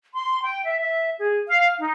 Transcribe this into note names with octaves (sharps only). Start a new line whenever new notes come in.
C6
G5
E5
E5
G#4
F5
D#4